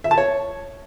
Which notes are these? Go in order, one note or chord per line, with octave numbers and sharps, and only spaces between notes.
E5
A5
C#5